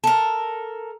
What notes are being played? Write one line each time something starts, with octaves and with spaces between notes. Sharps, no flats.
A4 A#4